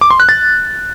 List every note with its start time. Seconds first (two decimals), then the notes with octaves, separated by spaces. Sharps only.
0.01 D6
0.10 C6
0.20 F#6
0.29 A6